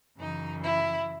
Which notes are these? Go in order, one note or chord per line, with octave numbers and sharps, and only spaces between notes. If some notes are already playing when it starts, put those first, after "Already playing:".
F#2 C#3 E3 D#4
E4